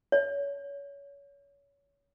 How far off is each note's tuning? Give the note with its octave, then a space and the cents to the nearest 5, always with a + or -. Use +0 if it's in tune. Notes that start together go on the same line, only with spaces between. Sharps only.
C#5 +25